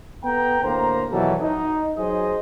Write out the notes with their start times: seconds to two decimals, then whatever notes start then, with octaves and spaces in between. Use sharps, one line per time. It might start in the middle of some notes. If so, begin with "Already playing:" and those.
0.24 B3 A4 G5 A#5
0.63 D2 A2 A#3 C5 A#5
1.11 B2 D#3 E3 F#3 G3 A4
1.42 D#4
1.97 F#3 D#4 G#4 C5 D#5